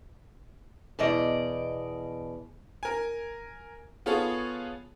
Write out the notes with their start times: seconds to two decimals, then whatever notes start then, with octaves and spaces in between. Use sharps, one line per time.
0.99 E2 B2 D5 D#5
2.83 A#4 G#5
4.06 B3 F4 G#4 A4 C#5